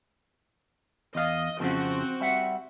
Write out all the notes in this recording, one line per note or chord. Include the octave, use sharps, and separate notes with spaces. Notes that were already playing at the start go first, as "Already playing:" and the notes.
E2 D#5 F5
F2 C#3 F3 C4 F#4
G3 E5 F#5